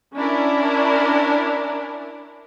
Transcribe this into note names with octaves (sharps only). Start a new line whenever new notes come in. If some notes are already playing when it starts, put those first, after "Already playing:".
C#4 D4 E4 A#4